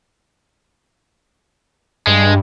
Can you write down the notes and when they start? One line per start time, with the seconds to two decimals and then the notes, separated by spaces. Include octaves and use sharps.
2.07 G2 G#3